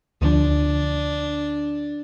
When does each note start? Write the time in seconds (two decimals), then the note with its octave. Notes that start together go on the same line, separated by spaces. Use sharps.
0.22 D2 F3 D4